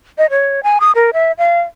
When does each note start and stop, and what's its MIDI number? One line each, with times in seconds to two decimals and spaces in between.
0.18 0.26 75
0.30 0.60 73
0.63 0.78 80
0.80 0.92 87
0.95 1.11 70
1.13 1.32 76
1.38 1.62 77